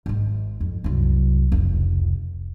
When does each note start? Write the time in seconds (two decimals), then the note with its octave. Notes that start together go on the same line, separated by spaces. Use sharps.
0.06 G#1 G#3
0.61 F2
0.84 C2 F#2
1.52 F1 C#2